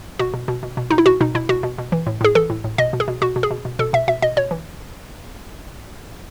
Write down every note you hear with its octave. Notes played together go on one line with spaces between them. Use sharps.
B2 F#4
B2
B2
B2
B2
B2 D#4
E4
B2 F#4
B2 D#4
B2 E4
B2 F#4
B2
B2
E3
A2
A2 G#4
E3 A4
A2
A2
B2 D#5
B2
G#4
B2
B2 F#4
B2
G#4
B2
B2
B2 A4
B2 E5
B2 E5
B2 D#5
B2 C#5
E3